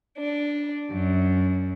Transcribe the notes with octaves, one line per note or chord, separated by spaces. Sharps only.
D4
F#2